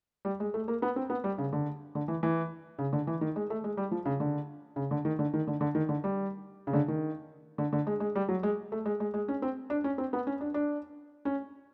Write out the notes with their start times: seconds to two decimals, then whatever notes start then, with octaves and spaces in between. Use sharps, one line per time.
0.25 G3
0.40 G#3
0.54 A3
0.68 A#3
0.82 B3
0.96 C4
1.10 B3
1.24 G3
1.38 C#3
1.53 D3
1.95 D3
2.08 E3
2.23 E3
2.79 C#3
2.93 D3
3.07 E3
3.21 D#3
3.36 G#3
3.50 A3
3.64 G#3
3.77 G3
3.91 F3
4.05 C#3
4.20 D3
4.76 C#3
4.91 D3
5.05 D#3
5.19 D3
5.34 D#3
5.47 D3
5.61 D3
5.75 D#3
5.89 D3
6.04 G3
6.67 C#3
6.73 D3
6.88 D#3
7.58 D3
7.73 D3
7.87 G#3
8.00 G#3
8.15 G3
8.29 F#3
8.43 G#3
8.72 A3
8.86 G#3
9.00 G#3
9.14 G#3
9.28 C#4
9.42 C4
9.70 D4
9.84 C#4
9.98 C4
10.13 B3
10.27 C#4
10.41 D4
10.54 D4
11.25 C#4